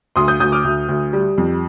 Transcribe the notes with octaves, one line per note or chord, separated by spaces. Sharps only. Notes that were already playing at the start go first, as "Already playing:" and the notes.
D2 C6 D#6
D#6 G6
D2 D#6 G6
D6 F6
D2
D2
G3
F2